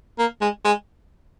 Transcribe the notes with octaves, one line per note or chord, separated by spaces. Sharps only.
A#3
G#3
G#3